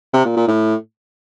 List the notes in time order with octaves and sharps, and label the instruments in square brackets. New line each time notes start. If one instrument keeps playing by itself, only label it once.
[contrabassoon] C3
A#2
A#2
A2